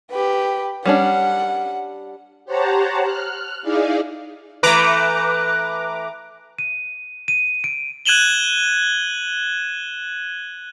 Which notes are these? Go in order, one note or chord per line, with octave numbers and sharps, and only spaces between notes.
G4 B4
G3 C#4 D4 F#5
G4 C5 C#5 F#5 A5 A#5
F6 F#6
D#4 E4 G#4 D5 F5
E3 A3 B4 A#5 D6 F#6
D#7
D#7
D7
F#6 G#6 D#7 E7 F#7 G7